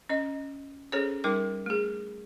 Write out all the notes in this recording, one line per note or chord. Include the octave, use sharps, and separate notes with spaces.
C#4 D#5
C#4 G#4 A4 C5 C#5
G3 D#4 A#4 G5 D6
A3 G#4